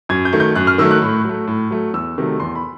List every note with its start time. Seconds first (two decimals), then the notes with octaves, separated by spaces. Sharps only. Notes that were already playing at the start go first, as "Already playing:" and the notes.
0.09 F#2 G#6
0.25 G6
0.33 D#3 F#3 A3
0.40 G6
0.55 F#2 F#6
0.67 F6
0.78 D#3 F#3 A3 E6
0.91 F#6
1.02 A2
1.24 F#3 A3
1.48 A2
1.71 F#3 A3
1.93 E2 E6
2.18 C3 D#3 F#3 A3
2.40 E2 C6
2.55 B5